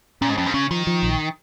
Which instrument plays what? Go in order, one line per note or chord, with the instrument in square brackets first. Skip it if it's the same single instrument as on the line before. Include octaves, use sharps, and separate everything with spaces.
[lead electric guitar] A#2 [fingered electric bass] C#4
[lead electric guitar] G#2
[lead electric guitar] F2 [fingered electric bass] C#4
[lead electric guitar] G#2
[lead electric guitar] C#3 [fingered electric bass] C#4
[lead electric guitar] D#3 [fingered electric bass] F3
[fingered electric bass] F3
A#1